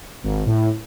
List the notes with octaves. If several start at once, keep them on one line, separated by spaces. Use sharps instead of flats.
G#1
A2